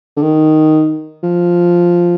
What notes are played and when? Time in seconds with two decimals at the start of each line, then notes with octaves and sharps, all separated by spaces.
0.17 D3
0.23 D#3
1.23 F3